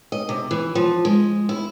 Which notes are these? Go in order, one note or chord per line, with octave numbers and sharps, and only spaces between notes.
D#5
C3
E3
F3
G#3
E4